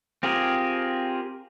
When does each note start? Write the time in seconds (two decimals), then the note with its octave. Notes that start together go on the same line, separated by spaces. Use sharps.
0.23 C4 F4 G4 G#4 A#4